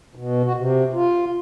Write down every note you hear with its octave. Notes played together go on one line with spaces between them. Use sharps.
B2
F#4
C3
F4